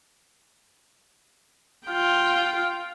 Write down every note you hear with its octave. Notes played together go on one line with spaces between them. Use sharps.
F4 G5